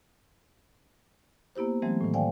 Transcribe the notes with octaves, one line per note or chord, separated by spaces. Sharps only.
A#3 B3 E4 G4 C5
E3 F#3 G#3 A3 C4
A2 D#3
C5 D5 F5 G5 G#5